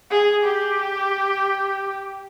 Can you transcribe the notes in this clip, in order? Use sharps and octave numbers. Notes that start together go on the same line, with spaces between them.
G#4
G4